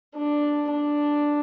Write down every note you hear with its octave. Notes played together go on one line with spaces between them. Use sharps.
D4
D4